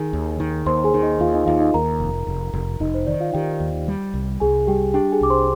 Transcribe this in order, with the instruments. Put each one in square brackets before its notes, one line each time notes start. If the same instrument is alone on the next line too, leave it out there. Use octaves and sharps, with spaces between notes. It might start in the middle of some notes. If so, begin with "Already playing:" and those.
Already playing: [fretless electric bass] D#3 [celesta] G#4 G#5
[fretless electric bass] D#2
D#3
[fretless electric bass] D#2 [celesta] C5 C6
[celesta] G#4 G#5
[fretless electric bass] D#3
[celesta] D#4 D#5
[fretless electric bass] D#2 [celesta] F4 F5
[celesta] D#4 D#5
[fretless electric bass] D#2 [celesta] F4 F5
[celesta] D#4 D#5
[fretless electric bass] D#2 [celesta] A#4 A#5
[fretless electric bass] F1
F1
F1
[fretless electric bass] F1 [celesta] D#4 D#5
[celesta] C5
[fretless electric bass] D#3 [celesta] D5
[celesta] F4 F5
[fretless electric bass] D#3 [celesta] G4 G5
[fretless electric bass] D#2
G3
C2
[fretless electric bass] C2 [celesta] G#4 G#5
[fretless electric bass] G3 [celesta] G4 G5
[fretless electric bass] D4 [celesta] G4 G5
[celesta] G#4 G#5
[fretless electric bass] C2 [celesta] D6
[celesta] C5 C6